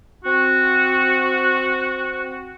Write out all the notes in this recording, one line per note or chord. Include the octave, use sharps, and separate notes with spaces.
C4 F#4